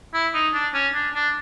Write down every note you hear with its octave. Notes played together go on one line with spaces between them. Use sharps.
E4
D#4
D4
C#4
D4
D4